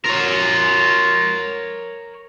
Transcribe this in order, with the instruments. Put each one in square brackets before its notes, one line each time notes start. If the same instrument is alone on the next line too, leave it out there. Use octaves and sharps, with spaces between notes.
[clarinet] F4 [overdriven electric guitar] A#4 C#5